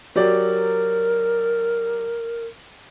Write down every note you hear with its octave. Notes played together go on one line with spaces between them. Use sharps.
F#3 G4 A#4 D5